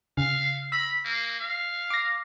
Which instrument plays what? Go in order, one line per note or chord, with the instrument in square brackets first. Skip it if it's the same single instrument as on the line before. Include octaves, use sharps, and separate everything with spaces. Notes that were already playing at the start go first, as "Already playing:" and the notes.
[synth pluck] C#3 [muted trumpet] F5
[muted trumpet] B5 [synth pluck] E6
[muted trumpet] A#3
F5
[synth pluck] D6 A#6